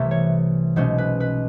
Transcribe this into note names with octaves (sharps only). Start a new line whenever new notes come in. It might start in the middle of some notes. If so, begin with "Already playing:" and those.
Already playing: C2 C3 E3 A3
C#5
B1 B2 G#3 C#4 C5
B4
B4